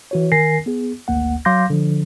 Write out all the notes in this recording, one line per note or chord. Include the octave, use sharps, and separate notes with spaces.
E3 F#4 C#5
D#3 A#4 G#5 A#6 C7
B3 G#4
G#1 D2 A#3 F#5
F#3 F5 C6 D6 G6 A#6
D3 F3